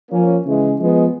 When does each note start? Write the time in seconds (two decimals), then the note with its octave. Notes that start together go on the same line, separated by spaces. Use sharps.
0.10 F3 A#3 C#4
0.43 C#3 E3 G#3
0.78 F3 G#3 B3